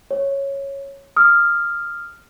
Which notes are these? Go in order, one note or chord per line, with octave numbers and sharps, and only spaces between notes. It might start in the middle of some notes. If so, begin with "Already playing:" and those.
C#5
D#6 F6